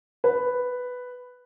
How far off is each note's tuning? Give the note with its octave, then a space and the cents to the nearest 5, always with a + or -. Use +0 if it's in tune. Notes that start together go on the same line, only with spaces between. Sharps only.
B4 +5